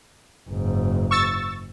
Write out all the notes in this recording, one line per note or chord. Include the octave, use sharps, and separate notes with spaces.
F#1 G#2
C#6 E6 A6